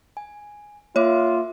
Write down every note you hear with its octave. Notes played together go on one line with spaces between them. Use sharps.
G#5
A#3 F4 C#5 E5 D6